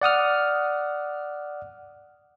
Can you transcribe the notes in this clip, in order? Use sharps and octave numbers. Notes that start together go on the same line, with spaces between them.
D5 F#5 D#6 F6